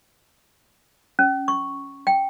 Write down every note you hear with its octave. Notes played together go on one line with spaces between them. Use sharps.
C#4
C#6
G5